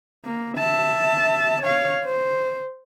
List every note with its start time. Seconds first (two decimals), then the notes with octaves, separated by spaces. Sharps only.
0.25 A#3
0.58 E5 A5
1.62 C#5 F5
2.05 C5